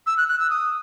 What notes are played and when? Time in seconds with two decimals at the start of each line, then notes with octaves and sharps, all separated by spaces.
0.06 E6
0.17 F#6
0.28 F#6
0.40 E6
0.50 D#6